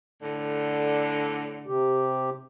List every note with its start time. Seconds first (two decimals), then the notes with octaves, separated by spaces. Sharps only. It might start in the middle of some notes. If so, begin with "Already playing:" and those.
0.22 A2 D3
1.67 C3 G4